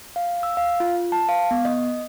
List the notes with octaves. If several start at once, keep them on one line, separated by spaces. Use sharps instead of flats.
F5
E6
F5
F4
A5
F5
B3
D#5